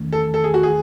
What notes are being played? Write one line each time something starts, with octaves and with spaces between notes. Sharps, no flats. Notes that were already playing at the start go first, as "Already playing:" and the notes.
Already playing: E2 D#3 A3 C#4
A4
A4
G#4
F#4
G#4